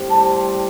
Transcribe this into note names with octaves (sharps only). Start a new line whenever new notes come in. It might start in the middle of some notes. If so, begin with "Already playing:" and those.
Already playing: A2 G3 C4 G4 C5
A5